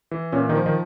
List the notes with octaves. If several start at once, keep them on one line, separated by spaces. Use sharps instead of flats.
E3
A#2 C#4
D#3 D#4
F3
D#3 D#4